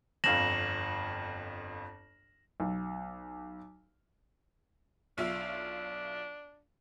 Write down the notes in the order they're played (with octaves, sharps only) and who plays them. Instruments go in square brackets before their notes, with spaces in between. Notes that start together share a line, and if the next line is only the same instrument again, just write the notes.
[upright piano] G1 F2 F5 [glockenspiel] A#6 E7 F#7
[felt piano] B1
[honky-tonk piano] B1 F4 E5 [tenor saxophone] D4